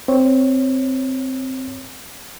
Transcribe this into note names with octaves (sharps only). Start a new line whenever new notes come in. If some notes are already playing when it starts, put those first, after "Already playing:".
C4 C#5